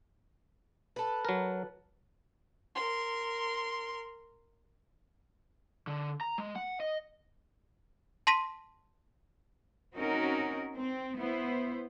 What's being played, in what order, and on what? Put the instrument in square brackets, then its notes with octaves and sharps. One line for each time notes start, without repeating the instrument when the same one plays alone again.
[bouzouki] A4 B4
[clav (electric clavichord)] F#3 A#4
[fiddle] A#4 C6
[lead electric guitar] D3
A#5
G#3
F#5
D#5
[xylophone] A5 C6 A#6 B6 D#7
[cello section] C4 C#4 D#4 F#4 A#4
C4
B3 E4 C5